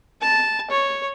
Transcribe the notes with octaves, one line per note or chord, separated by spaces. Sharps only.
A5
C#5